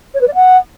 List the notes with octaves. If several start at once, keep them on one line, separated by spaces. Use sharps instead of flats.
C#5
B4
D5
F#5